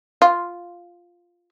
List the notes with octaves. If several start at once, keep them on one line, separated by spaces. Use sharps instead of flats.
F4